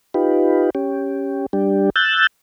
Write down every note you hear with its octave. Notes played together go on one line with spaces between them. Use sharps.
D#4 F4 G4 B4
C#4 G4
G3 D4 G4
E6 F#6 G6 A6